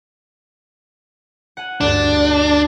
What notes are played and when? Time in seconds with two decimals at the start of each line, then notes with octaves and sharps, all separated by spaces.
1.57 F#5 G#5
1.81 D2 G2 D4